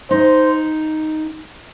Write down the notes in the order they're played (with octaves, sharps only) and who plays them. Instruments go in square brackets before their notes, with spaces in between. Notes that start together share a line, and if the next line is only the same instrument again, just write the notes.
[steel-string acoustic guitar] D#4 [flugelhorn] C5